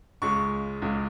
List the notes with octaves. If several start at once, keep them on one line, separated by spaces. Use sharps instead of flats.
C#2 C#3 G#3 C#6
C#2 C#3 G#3